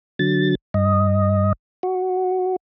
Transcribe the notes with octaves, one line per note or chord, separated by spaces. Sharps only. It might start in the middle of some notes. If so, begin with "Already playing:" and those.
D3 F#3 A6
G2 D#5
F#4